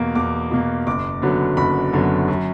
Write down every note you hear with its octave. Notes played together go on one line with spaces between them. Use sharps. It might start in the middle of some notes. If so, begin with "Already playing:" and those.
Already playing: E2 B2 A#3
E2 D6
B2 A#3
F#1 D6
F#2 D3 F#3 B3
F#1 B5
F#2 D3 F#3 B3
F#2